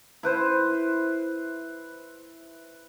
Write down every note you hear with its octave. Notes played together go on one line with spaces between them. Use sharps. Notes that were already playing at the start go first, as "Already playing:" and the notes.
E4 B4 C5